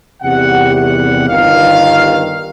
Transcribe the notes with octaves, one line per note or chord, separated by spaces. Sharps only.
E2 C3 D#3 G3 F#5
F#5
G1 G2 D#3 F5